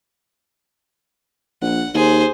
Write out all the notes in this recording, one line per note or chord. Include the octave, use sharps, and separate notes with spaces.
A#1 F#5
D#2 G#4 C5